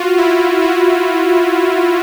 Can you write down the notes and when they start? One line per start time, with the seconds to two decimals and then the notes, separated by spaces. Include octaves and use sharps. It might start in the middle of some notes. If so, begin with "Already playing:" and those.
Already playing: F4 F#4
0.17 E4
0.62 F#4